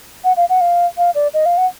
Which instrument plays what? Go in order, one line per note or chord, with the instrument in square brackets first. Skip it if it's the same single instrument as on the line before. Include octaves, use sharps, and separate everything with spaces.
[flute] F#5
F5
F#5
F5
F5
D5
D#5
F5
F#5